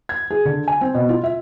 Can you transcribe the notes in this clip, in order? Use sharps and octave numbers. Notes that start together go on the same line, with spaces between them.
G#6
G#4
D3
G#5
C4
B2
F4
E5